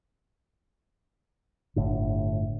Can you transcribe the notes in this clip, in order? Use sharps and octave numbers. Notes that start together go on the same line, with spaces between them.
G1 A2 D3